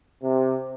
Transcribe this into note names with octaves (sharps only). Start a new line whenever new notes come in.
C3